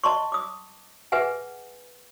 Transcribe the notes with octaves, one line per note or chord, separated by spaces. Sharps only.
D#5 A5 C6 C#6
D6 D#6
G#4 B4 E5 F#5 G#5